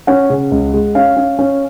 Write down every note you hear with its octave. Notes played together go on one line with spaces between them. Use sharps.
C#4 F#5
C#3
C#2
G#3
C#4 F5
C#4
C#4